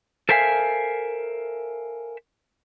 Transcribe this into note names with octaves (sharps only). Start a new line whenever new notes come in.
A4 A#4 C5 E5 F5 G#5